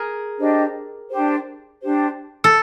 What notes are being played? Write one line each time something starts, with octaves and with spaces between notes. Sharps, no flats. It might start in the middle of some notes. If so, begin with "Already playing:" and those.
Already playing: G#4 A#4
D4 G4 C5 D#5
D4 G4 C5
D4 G4 C5
A4